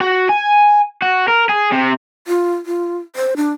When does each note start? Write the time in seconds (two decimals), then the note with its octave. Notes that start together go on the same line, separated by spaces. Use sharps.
0.01 F#4
0.29 G#5
1.02 F#4
1.28 A#4
1.49 G#4
1.72 C3
2.27 F4
2.66 F4
3.16 C5
3.37 D4